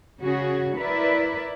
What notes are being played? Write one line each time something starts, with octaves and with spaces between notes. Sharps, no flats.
C#3 C#4 F#4 G#4
E4 A#4 B4 D5 E5